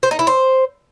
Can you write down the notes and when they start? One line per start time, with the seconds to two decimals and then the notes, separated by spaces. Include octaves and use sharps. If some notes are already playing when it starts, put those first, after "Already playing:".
0.03 C5
0.11 D#4
0.19 E4
0.27 C5